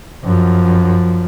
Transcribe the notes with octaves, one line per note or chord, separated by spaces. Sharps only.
F#2 F3